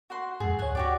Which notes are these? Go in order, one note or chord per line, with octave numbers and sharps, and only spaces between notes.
F#4 F#5 C6
F2 G#2 G#4
D2 C#5 F#5 G#5
F#4 G4 D5